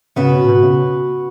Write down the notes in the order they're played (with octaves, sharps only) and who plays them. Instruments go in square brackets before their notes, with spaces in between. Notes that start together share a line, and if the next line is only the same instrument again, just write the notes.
[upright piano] C#3 [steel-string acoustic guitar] B3 F#4 B4
[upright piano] B2
B2
C#3